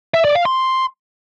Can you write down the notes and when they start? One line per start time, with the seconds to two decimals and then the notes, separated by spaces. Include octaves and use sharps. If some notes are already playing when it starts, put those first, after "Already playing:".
0.14 E5
0.25 D5
0.35 F5
0.45 C6